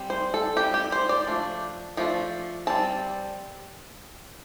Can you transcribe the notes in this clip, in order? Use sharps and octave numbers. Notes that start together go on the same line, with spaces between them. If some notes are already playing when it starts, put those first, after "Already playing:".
Already playing: G3 C4
C5
A4
G3 C4 G4
G4
C5
D5
F3 A3 D4
F3 A3 D4
G3 C4 A5